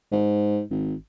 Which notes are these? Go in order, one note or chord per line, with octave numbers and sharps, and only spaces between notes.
G#2
G#1